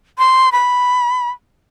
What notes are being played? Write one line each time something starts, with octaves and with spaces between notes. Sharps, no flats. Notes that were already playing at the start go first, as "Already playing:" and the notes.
C6
B5